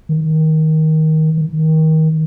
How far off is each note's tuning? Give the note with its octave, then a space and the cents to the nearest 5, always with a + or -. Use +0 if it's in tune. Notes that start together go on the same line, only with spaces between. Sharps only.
D#3 +15
D#3 +25